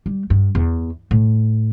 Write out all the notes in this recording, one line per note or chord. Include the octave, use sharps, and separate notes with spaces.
G3
G2
E2
A2